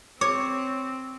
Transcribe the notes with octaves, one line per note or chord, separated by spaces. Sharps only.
C4 C#5 D6